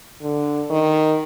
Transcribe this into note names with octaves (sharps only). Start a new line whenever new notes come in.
D3
D#3